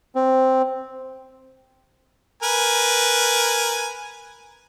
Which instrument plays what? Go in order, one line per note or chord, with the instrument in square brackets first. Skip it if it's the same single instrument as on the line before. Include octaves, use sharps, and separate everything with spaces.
[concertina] C4
[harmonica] A#4 B4 G#5